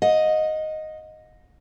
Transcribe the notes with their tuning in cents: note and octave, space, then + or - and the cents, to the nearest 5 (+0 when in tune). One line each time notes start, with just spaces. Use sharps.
D#5 +0 F#5 -40